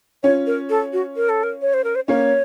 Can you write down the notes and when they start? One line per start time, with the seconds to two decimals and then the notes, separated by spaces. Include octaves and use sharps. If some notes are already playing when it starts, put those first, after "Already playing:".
0.23 C#4 F4 C#5
0.47 A#4
0.70 A4
0.93 F#4
1.17 A#4
1.29 A4
1.43 A#4
1.62 C#5
1.74 C5
1.84 A#4
1.95 C5
2.08 A#3 C#4 C#5